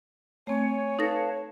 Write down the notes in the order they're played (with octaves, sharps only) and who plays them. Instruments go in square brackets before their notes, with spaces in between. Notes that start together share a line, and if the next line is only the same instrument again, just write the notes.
[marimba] A3 C4 [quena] C#5 [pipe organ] G#5
[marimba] D#4 A4 A#6 [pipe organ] B4 F5 A5